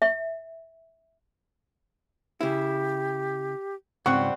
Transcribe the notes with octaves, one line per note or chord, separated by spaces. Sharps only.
E5
C#3 E4 G4
C#2 G#2 G3 C4 F#5 C#6 F#6